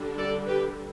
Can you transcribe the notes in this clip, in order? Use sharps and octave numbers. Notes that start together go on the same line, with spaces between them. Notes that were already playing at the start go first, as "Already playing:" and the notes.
Already playing: D3 G3 D4
A4 D5
G4 B4